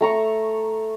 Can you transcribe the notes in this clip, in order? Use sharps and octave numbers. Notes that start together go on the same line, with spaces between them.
A3 A#5 C#6